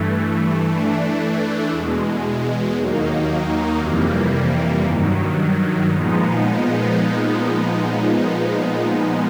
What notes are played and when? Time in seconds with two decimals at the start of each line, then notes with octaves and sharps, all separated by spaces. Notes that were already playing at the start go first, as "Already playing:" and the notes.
Already playing: G2 E3 A3
0.66 E3 A3 D4
1.70 E2 B2 G#3
2.75 D#2 D#3 F#3 A#3 D#4
3.79 F2 C3 E3 G3 A#3
4.84 G2 D#3 F#3
5.88 A#2 F3 G#3 B3 D#4